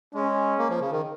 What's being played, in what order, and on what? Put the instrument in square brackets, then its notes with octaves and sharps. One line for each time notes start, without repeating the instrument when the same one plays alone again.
[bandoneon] G#3 [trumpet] C#4
[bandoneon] A#3
F3
C#3
D#3